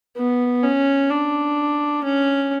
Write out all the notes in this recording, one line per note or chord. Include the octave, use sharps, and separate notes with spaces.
B3
C#4
D4
C#4